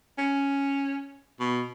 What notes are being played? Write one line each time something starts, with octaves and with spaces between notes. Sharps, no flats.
C#4
B2